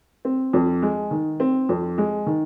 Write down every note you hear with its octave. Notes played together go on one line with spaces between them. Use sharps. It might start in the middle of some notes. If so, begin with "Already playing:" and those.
C4
F2
G#3
D#3
C4
F2
G#3
D#3